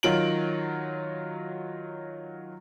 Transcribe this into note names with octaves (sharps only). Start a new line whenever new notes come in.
D#3 F#3 F4 D7 F#7